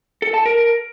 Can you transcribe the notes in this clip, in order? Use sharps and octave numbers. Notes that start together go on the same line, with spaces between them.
A4
A5
A#4